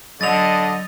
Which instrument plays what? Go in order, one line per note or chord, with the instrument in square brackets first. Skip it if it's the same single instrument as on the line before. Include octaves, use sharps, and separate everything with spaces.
[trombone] D3 [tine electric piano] F#3 [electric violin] D#5 [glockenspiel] A6 F7